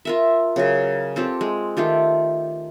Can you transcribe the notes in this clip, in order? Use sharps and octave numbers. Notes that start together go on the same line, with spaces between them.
F4 A#4 E5
C#3 F#3 A#4
C4 F4 G4 A4
G#3
D#3 A3 F4 G4